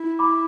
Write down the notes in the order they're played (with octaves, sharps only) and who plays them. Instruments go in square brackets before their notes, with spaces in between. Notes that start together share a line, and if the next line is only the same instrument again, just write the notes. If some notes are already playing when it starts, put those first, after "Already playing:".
Already playing: [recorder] E4
[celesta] B5 D6